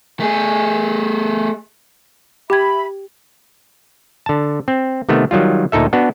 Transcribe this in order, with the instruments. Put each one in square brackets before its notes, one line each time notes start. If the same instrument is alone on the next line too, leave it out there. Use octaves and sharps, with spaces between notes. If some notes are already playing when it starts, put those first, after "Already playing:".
[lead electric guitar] A3 G#4
[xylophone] G4 G5 G#6 [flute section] E5 B5
[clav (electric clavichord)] D3 A5
C4
C3 D#3 A3 B3
D#3 F#3 G3 F4
D2 A#2 D#4 A4 E5
B3 D4 F#4